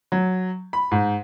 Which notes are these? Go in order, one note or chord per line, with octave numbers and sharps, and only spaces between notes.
F#3
B5
G#2